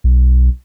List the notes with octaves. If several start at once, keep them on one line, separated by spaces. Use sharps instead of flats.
B1